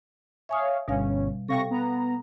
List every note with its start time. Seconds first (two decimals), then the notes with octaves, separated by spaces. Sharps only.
0.49 C#5 E5 F5 G#5 D#6
0.88 G1 B2 G3 C#4 F5
1.48 C3 A4 F5 G5 C#6 A#6
1.71 B3 A#5